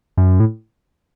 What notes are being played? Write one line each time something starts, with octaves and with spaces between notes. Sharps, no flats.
F#2
A2